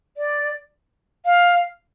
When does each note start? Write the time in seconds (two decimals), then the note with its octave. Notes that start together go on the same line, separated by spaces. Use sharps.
0.17 D5
1.25 F5